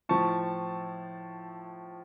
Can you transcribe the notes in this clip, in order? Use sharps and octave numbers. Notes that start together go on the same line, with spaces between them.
A2 F3 A5 C#6